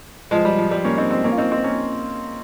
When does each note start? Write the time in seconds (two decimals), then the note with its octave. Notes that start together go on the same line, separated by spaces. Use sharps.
0.31 F3 G#3
0.45 G3
0.58 F3
0.71 G3
0.84 A#3 C#4
0.98 C4 D#4
1.11 G#3 C4
1.24 A#3 C#4
1.32 F4
1.38 C4 D#4
1.52 C4 D#4
1.64 A#3 C#4